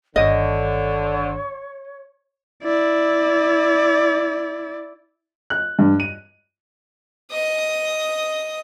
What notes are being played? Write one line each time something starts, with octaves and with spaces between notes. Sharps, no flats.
G1 D3 D#3 C#5 D#5
E4 D5
F#6
G2
D#7
D#5 D#6